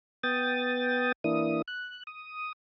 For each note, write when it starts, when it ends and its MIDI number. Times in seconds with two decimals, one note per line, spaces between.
0.23 1.12 59
0.23 1.12 79
0.23 1.12 87
0.23 1.12 93
1.24 1.62 52
1.24 1.62 58
1.24 1.62 62
1.24 1.62 64
1.24 1.62 87
1.68 2.03 90
2.07 2.52 87